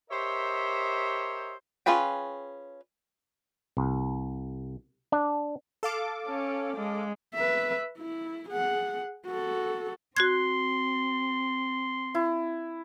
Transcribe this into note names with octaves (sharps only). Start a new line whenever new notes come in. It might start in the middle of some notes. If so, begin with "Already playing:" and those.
G4 A#4 C5 C#5 D#5 E5
C#4 F4 G#4 B4 G5
C2
D4
A4 F5 D6
C#4
G#3
B4 E5
E4
G#4 F#5
F#4 A4
C4 F#4 C6 F#6 G#6
E4